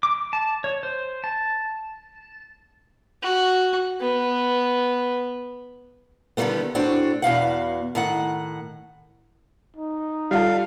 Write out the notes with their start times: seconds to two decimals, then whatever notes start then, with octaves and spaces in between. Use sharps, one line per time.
0.03 D6
0.33 A5
0.64 C#5
0.83 C5
1.24 A5
3.23 F#4
4.01 B3
6.37 D3 D#3 F3 G3 A3 B3
6.75 A2 C4 D4 F#4
7.22 E2 B2 F5 F#5
7.95 A2 D#3 F#5
9.76 D#4
10.31 G3 F4 A4 F5